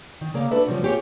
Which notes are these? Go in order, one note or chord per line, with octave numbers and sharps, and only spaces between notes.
D#3
C#3 A#3 D5 F5
D4 F#4 A4 B4 E5
C#3 F3 G3 A3 C#4 F#4
B3 C4 F4 G4 G#4 C#5